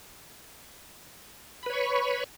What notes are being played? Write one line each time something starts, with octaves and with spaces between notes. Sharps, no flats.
B4 C#5 B5 C#6